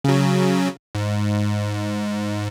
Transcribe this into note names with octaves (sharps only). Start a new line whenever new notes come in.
C#3 F#3
G#2